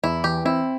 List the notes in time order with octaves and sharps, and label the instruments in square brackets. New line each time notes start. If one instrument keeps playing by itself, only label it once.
[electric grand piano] E2 [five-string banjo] E4
[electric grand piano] E3 [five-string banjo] G4
[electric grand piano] C4 [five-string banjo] E4